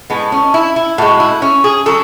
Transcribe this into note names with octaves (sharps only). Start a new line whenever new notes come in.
A2 G#3 B3
C#4
E4
E4
A2 G#3 F#4
E4
C#4
G#4
C#3 F#3 A4